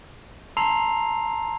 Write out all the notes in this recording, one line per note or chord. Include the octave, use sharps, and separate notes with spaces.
A5 A#5 C6 E6 C7 F7